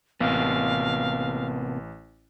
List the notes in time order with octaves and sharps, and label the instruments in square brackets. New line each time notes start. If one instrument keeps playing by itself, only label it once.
[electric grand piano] A1 [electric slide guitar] C3 A#3 B3 [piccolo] F5